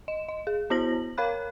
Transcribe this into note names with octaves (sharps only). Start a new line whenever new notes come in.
D#5 E7
D#5
G#4
B3 E4 F#4 C5 A#6 F#7
A#4 C#5 F5 B5 F#6